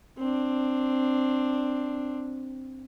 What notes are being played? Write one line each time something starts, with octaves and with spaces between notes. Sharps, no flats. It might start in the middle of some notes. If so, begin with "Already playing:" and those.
C4 D4